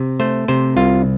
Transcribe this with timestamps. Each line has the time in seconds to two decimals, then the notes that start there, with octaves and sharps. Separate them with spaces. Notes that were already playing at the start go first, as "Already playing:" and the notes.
Already playing: C3
0.20 A3 C5
0.48 C3 C5
0.76 C2 F4